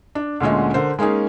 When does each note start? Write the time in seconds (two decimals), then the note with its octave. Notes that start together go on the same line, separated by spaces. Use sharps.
0.15 D4
0.41 D2 A#2 D3 G#3 C#4 D#5
0.74 D3 A#4 C5
0.99 G#3 A#3 C#4 D#4 G#4